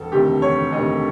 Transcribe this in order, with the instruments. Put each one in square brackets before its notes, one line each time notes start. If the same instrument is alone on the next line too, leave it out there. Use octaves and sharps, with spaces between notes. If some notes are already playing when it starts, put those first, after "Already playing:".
Already playing: [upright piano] E1 A4
D2 C3 D#3 G4
E1 C#5
D2 C3 D#3 D#5